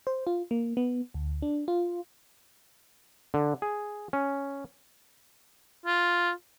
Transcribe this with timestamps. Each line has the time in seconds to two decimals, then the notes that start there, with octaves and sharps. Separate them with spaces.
0.07 C5
0.27 F4
0.51 A#3
0.77 B3
1.14 D2
1.42 D4
1.68 F4
3.34 D3
3.62 G#4
4.13 C#4
5.86 F4